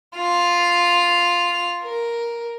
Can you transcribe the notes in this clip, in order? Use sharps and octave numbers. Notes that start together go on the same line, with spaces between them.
F4 F7
A#4